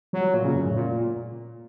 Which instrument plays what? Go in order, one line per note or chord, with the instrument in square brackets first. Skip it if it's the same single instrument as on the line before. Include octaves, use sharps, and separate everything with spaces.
[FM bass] F#3
A#2
C#3
F#2
A2
A#2